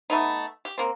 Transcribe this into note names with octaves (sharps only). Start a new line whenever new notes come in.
A3 B3 D#4
G4
A#3 C4